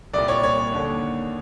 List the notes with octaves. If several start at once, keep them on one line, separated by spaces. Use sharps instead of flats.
C2 A#2 D5
C#5
C#5
D#2 D3